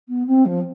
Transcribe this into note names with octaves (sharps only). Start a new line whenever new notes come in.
B3
C4
F3